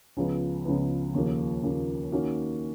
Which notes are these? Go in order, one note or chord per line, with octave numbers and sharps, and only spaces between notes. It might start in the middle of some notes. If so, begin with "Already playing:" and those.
C#2 C#3 F3 B3
C#2 C#3 F3 B3
D#2 C#3 F3 A#3
D#2 C#3 F3 A#3
D#3 A#3 C#4 F#4